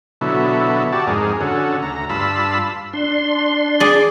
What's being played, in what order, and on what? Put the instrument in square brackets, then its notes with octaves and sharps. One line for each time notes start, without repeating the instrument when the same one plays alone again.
[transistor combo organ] B2 D3 F#3 E4 A4
F#4 G4 D5 A5
F2 G#2 G#4 A#4
D3 C#4 F#4 A4
D2 A#5
G2 F4 A5 B5 E6
[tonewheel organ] D4 C6
[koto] G#4 D5